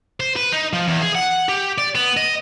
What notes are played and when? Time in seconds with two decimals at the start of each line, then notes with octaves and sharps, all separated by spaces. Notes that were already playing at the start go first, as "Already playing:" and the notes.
0.20 C5
0.36 B4
0.52 D#4
0.73 F3
0.88 E2
1.02 G#4
1.15 F#5
1.49 G4
1.78 D5
1.95 B3
2.17 D#5